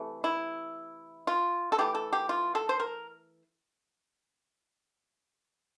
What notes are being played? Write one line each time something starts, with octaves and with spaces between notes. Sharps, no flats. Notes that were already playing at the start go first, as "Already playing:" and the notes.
Already playing: C3 E3 A3
E4
F4
A4
E3 A3 G4
A4
G4
F4
A4
C5
A#4